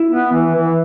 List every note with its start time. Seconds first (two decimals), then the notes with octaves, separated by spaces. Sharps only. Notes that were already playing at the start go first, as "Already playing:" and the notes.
Already playing: E4
0.11 B3
0.32 E3
0.55 E3